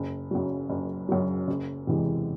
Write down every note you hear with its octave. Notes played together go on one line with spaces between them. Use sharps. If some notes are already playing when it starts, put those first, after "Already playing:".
Already playing: F#1
F#2 C#3 F#3
F#1
F#2 C#3 F#3
F#1
E2 C3 E3 G#3